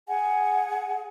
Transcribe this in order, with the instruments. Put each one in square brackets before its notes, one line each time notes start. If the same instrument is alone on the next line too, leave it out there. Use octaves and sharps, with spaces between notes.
[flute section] G#4 F#5 G#5